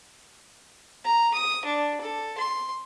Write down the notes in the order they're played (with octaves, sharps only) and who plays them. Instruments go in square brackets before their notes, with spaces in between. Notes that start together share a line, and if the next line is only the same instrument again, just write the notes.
[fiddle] A#5
D#6
D4
A4
C6